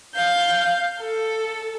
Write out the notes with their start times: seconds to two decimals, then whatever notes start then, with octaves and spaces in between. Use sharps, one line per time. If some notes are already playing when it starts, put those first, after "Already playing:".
0.14 F5 G6
0.99 A4